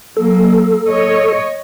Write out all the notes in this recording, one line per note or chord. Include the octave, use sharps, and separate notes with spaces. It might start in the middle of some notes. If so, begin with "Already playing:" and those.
F#3 A#3 A4
C#5 D#5